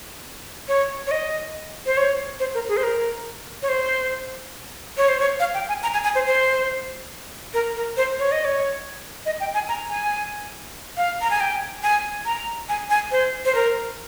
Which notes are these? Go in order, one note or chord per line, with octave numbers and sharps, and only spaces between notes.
C#5
C#5
D#5
C5
C#5
C5
A#4
G#4
C5
A#4
C#5
C5
C#5
C5
C#5
F5
G5
G#5
A#5
G#5
G#5
C5
C5
A#4
A#4
C5
C#5
D#5
C#5
D#5
G5
G#5
A#5
G#5
F5
A#5
G#5
G5
G#5
A#5
G#5
G#5
C5
C5
A#4